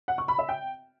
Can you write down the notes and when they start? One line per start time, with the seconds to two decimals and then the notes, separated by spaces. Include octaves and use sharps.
0.08 F#5
0.18 C#6
0.28 B5
0.38 E5
0.49 G5